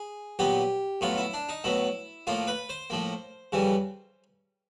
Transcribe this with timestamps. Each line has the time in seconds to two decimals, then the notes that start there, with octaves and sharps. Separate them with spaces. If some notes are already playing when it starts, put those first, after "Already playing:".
Already playing: G#4
0.39 A#2 F#3 B3 G4
1.01 A2 F#3 B3 F4
1.18 E4
1.34 D4
1.49 D#4
1.64 A2 F#3 B3 E4
2.27 A2 F3 A#3 F4
2.47 B4
2.69 C5
2.90 A2 F3 A#3
3.52 F2 C#3 E3 G3